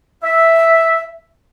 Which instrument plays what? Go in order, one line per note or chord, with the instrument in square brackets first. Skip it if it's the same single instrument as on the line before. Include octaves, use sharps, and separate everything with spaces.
[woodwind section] E5